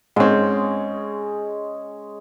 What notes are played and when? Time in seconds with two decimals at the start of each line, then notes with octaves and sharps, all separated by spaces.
0.16 G#2 G#3 C4 C#4